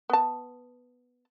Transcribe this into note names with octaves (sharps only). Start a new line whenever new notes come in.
B3 A5